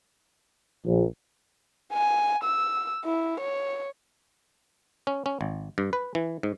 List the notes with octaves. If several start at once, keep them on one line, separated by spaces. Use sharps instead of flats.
A#1
G#5
E6
E4
C#5
C#4
C#4
G#1
G2
B4
E3
G#2